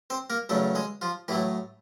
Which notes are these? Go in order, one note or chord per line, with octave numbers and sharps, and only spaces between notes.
C4 C5
A#3 A#4
E2 C#3 F#3 A3 A4
G#3 G#4
F3 F4
A2 E3 F#3 A3 E4